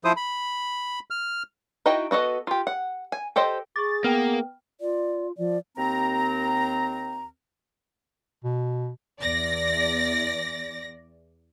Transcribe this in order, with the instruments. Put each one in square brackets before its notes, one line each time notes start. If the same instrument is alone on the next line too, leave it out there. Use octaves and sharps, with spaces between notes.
[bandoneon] F3 E4 C5 D#6
B5
F6
[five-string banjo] D#4 E4 F#4 D#5 G5
B3 F#4 A4 D#5
F4 G4
F#5
G#5
G4 A4 C5 D#5
[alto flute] G#4 [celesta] C#6 D6 [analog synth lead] A6
[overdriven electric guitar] A#3 [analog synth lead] B3 [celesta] G5 F6
[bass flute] F4 [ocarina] D5
[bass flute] F3 [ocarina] D5
[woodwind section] D#2 C4 A#5
[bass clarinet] B2
[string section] E2 D5 A#6